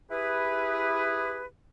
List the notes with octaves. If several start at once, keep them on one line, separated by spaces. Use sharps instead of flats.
E4 G4 G#4 B4